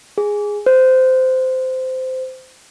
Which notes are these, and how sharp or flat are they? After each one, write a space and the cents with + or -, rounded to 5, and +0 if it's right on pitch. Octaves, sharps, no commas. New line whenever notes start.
G#4 -5
C5 -15